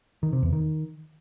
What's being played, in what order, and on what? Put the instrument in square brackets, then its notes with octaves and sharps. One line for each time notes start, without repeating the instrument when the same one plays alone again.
[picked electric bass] D#3
C3
E2
D#3